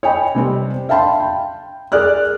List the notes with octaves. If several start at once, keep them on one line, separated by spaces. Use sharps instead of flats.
C#5 D#5 G5 G#5 B5
C3 G3 C4
E5 F5 G5 A5 B5 C6
G5
G#4 A#4 D5 F6 F#6